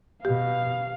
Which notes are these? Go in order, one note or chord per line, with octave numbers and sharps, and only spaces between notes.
B2 G4 F5